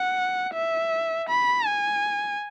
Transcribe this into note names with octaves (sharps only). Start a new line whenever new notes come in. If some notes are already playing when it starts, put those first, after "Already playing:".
Already playing: F#5
E5
B5
G#5